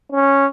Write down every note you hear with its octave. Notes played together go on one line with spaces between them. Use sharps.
C#4